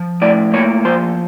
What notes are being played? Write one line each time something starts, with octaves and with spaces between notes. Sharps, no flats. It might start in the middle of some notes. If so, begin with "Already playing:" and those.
Already playing: F3
A2 D5
A#3 C#5
F3 C5